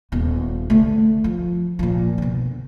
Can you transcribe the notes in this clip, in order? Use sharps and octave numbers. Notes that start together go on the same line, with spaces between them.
D#1 B3
D3 A3
F3
A#2 F3
B2 D3